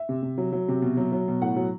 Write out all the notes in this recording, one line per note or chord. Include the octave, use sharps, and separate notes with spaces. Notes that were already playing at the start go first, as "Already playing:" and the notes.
Already playing: E5
C3
C3
F#3
F#3
C3
B2
F#3
F#3
B2
A2 F#5
F#3